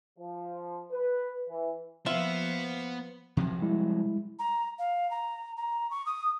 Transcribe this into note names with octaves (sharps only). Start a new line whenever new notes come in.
F3
B4
E3
F3 A#3 B3 F4 C5 E5 F5
C3 F3 F#3
G3 G#3 E4
A#5
F5
A#5
A#5
C#6
D#6